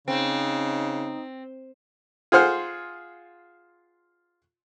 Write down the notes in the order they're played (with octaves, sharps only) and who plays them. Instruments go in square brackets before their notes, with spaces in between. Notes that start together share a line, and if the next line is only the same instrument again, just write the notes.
[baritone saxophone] C#3 [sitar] C4 [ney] D#4
[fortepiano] F4 G#4 C5 F#5 F6